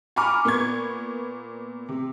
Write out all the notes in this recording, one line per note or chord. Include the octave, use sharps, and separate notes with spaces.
G#5 A#5 B5 C#6 D6 F6
A#2 B3 C#6 G#6
C3